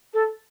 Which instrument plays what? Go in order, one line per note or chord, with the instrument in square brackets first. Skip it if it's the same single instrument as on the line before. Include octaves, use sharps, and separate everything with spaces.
[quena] A4